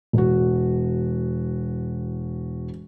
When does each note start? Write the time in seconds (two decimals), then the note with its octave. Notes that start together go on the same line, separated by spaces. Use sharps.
0.13 E1 F#4